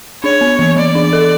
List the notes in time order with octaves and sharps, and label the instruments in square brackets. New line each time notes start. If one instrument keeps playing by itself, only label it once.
[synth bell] D4 [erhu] C#5
[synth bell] B3
E3
[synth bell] E3 [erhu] D5
[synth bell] D4
A4